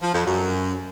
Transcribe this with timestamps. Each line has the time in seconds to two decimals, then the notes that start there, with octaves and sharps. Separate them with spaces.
0.02 F3
0.14 F2
0.25 F#2